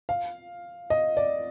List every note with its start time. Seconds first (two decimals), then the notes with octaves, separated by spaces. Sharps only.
0.09 F5
0.90 D#5
1.17 D5